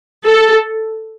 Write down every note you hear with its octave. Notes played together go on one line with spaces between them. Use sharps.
A4